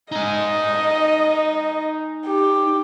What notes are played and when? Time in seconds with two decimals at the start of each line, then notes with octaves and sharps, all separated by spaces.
0.12 D#4 D#5 G#5
2.27 G4